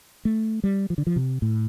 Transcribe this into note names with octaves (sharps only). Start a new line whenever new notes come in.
A3
G3
F3
D3
F3
C3
A2